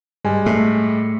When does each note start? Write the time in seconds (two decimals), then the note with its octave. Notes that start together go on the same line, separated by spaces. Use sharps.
0.24 G2 G3 G#3 G#5
0.46 A2 A3